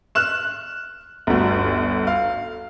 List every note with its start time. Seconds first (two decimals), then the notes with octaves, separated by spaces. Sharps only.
0.15 F6 F#6 E7
1.27 G1 D2
2.07 F5